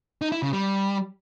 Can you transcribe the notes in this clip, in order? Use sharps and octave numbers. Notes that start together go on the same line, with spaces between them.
D#4
E4
C#3
G3